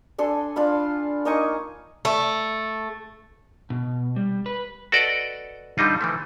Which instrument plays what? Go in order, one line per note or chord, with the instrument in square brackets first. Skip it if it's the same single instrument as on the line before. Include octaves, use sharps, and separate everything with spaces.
[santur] D4 A4 G#5 C6
D4 F4 F5 B5
A#3 D#4 G#5 C#6
[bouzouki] A3
[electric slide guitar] B2
G3
B4
[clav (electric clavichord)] F#4 A4 B4 D5 D#5 F#5
D3 G3 D#4 F4
E3 F3 A3